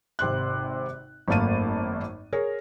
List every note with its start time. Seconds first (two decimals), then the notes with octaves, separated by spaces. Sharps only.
0.19 G#1 C3 C6 F#6
1.28 G#1 F#2 A3 A#3 A5 D#7
2.33 G#4 A#4 C#5